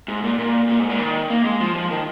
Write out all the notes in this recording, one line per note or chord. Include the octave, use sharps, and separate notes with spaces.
G#2
A#2
A#2
A#2
G#2
A#2
D#3
A#3
G#3
F3
F3
D#3